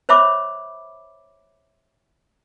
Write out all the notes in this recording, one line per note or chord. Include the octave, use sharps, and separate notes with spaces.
C5 C#5 E5 B5 D6